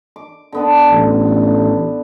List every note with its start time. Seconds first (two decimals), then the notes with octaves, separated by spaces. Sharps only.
0.16 D6
0.52 D3 B3 D4
0.90 A1